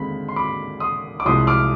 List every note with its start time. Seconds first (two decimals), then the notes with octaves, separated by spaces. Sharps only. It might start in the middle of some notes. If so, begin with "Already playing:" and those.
Already playing: D#2 D3 G#3 C4 B5
0.29 C6
0.36 B5 D6
0.80 C6 D#6
1.20 D6
1.25 C2 C3 F3 G#3 C6 D#6
1.47 D6 F6